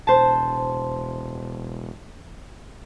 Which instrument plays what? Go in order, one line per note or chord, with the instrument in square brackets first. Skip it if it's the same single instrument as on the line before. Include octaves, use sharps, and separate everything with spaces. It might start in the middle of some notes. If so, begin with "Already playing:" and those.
[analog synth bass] E1 [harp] C5 A5